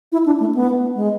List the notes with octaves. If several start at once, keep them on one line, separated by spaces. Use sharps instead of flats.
E4
D4
A3
B3
G#3